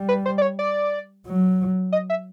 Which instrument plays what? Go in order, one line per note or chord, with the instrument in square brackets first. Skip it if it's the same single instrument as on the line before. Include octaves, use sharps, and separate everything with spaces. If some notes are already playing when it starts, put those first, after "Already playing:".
Already playing: [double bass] G3
[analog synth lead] B4
C5
D5
C#5
D5
[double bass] F#3
[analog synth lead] D#5
E5